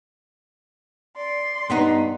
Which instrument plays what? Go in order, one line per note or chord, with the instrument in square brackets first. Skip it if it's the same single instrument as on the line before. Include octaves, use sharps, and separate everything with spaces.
[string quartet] D5 C6
[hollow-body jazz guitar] G2 B3 D#4